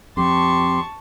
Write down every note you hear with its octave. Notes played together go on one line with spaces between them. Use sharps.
F2 G4 A5 C6 C#6